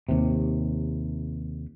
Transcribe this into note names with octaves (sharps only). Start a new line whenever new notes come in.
D#2 C3